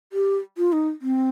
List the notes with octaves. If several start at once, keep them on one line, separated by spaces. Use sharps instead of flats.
G4
F4
D#4
C4